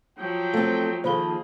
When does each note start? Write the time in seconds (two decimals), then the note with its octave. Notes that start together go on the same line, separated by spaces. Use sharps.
0.18 F3 F#3 G5
0.54 A3 C4
1.04 D#3 F3 A#3 G#4 A4 C5 B5 G7